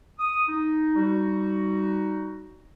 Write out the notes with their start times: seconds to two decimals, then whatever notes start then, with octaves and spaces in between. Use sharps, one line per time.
0.19 D#6
0.48 D#4
0.96 G3 D#4 F#4